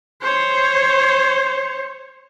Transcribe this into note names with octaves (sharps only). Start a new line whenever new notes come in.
C5 C#5